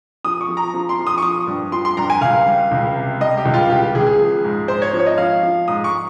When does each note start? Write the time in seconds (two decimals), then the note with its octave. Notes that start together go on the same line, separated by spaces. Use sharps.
0.25 F3 D#6
0.41 C#6
0.48 F3
0.57 A#5
0.74 F3
0.89 C6
0.99 F3
1.07 D#6
1.18 C#6
1.22 F3 D#6
1.47 G2
1.72 F3 C6
1.85 C6
1.97 G2 A#5
2.10 G#5
2.21 C#2 F5
2.47 G3
2.71 C#2
2.95 C3
3.20 G3 D#5
3.37 G4
3.45 C#2
3.54 F4
3.70 C#2 G4
3.82 G4
3.95 C#2 G#4
4.07 G#4
4.19 F3
4.45 G#2
4.68 G#2 C5
4.82 C#5
4.93 F3
4.99 C#5
5.06 D#5
5.18 F3 F5
5.43 F3
5.68 G#2 D#6
5.84 C#6